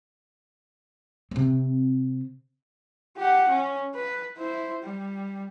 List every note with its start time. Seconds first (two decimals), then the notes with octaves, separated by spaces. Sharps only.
1.31 C3 C4
3.17 G4 F#5
3.49 C#4
3.95 B4
4.37 E4 C5
4.84 G3